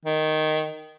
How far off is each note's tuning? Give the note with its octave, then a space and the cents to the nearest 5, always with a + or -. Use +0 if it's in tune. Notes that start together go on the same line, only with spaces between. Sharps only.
D#3 -5